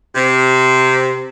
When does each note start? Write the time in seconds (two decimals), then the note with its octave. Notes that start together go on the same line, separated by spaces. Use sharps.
0.15 C3